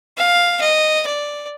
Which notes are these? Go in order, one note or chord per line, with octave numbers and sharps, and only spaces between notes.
F5
D#5
D5